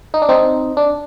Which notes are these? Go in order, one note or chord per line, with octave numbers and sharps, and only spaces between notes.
D#4
D4
C4 D#4
D4